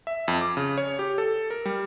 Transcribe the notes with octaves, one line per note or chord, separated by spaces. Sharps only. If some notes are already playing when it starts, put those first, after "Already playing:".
E5
F2
D6
C#3
C#5
G4
A4
A#4
G3